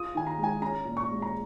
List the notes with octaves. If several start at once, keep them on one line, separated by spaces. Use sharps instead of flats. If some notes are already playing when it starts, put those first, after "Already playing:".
Already playing: F4 D#6
D#3 G#5
A#5
G#3
G#5
C#4 A#5
A#2
C#6
G#3
A#5